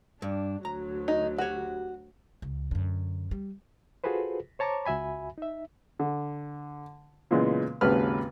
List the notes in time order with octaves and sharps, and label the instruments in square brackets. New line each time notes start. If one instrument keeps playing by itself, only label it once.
[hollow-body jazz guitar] G2 [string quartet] D4
[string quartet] D2 F#3 [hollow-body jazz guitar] A#5
[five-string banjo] D#4
[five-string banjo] F#4 [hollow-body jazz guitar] G4 C#5
[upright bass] C#2
F#2 D3
G3
[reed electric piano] F4 F#4 G#4 A4 B4 C5
C5 C#5 A5 A#5 C#6 D6
C#2 F#4 E5 G#5 B5
D#4 E5
[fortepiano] D3
A#2 C#3 E3 G#3 B3
G#1 D#2 C#3 B4 B5 F6